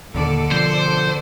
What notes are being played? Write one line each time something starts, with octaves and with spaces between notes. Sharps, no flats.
D#2 A#2 D3 A4 D5
B2 F3 C5